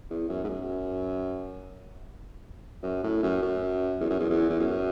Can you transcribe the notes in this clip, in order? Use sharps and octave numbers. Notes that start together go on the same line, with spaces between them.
E2
F#2
G#2
F#2
F#2
A2
F#2
F#2
E2
F#2
E2
E2
E2
F#2